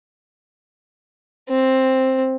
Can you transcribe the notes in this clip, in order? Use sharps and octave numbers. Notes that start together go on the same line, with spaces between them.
C4